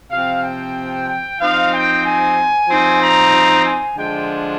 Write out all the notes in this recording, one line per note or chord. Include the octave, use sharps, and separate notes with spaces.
C3 F3 C4 F5
G5
G5
F3 C4 D#4 F5
G5
G#5
F3 C4 D#4
A#5
G#5
D3 F3 G#3 D4 G5